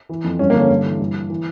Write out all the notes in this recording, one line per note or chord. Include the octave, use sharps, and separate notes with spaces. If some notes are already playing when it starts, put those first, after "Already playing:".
E3
F2
G2 C#4
A#3
D3
C#4
G2
E3
G2
E3
E3